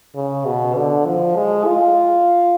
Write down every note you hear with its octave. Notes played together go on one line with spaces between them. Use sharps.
C#3
B2
D3
F3
G#3
F4